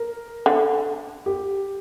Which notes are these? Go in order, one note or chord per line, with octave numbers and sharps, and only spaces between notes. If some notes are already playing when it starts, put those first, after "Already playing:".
Already playing: A#4
D3
G4